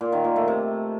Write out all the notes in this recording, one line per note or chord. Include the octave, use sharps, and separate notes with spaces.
A#2
D#3
A#2
A3
C3